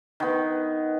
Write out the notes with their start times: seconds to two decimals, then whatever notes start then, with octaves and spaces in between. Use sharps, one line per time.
0.20 D#3 B3